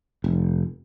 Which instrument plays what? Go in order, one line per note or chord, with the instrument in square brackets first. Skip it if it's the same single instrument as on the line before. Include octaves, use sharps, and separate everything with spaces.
[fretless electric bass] F1